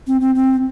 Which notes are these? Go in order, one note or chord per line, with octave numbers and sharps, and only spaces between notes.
C4
C4
C4